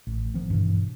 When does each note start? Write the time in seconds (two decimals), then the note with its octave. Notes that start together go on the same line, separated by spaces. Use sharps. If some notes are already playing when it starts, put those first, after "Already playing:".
0.07 A1
0.34 D#3 F3 C4
0.50 G2 B2 E3